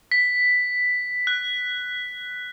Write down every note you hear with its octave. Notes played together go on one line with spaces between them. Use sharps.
B6
F#6